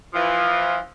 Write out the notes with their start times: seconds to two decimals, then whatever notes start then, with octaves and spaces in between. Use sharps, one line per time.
0.14 E3 F3